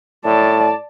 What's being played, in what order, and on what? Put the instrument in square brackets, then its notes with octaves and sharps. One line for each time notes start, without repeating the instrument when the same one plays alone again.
[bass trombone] A2 [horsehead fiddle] D5 A5